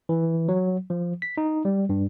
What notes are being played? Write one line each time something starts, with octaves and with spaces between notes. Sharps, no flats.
E3
F#3
F3
B6
D#4
G3
G2